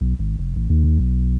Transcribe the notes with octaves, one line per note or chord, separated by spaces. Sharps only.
B1
G#1
F1
A1
D#2
D#2
B1